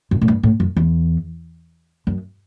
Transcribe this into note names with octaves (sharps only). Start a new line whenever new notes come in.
F#2
A2
G2
A2
F#2
E2
F#2